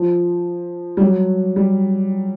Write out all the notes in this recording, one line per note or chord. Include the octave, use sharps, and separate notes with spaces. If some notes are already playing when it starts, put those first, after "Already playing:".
Already playing: F3
G3
F#3
G3